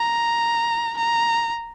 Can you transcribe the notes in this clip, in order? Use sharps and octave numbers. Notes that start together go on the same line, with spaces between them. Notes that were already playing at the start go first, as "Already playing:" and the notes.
Already playing: A#5
A#5